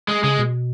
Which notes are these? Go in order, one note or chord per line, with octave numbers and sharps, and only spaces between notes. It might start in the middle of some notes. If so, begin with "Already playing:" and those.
G#3
C#3 G#3
B2